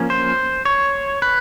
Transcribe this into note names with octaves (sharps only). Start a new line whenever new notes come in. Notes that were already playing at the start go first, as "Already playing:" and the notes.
Already playing: F3 A#3 C#4
C5
C#5
B4